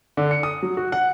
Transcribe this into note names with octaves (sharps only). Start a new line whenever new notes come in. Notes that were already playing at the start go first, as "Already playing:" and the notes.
D3
C#7
D#6
F#3
F#4
F#5